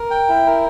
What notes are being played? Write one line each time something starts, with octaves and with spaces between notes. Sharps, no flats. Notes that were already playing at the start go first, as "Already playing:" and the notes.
Already playing: A#4
G5
E4
A#4